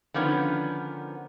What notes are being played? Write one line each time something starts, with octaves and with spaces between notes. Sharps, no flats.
D3 D#3 F3 B3 C#4